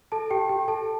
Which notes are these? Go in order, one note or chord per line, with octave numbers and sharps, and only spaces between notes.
A4 A5
G4 G5
G4 G5
A4 A5